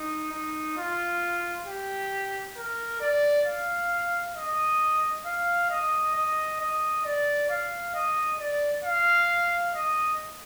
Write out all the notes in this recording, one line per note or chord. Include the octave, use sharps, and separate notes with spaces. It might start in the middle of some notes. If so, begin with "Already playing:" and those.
Already playing: D#4
D#4
F4
G4
A#4
D5
F5
D#5
F5
D#5
D#5
D#5
D5
F5
D#5
D5
F5
D#5